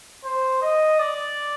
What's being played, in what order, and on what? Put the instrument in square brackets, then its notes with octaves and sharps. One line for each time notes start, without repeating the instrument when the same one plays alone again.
[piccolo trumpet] C5
D#5
D5